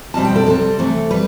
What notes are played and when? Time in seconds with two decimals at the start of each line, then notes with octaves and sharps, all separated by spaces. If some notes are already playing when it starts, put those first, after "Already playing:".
0.14 E2 B2 G3 C4 A5
0.25 G5
0.36 A4
0.46 C3 G3 C4 A4
0.79 C3 E3 A3 C4
1.11 G3 B4